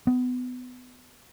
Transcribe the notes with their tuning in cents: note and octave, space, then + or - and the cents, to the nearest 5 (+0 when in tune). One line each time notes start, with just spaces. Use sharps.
B3 +25